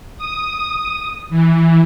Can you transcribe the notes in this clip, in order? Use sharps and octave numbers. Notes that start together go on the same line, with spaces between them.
D#6
E3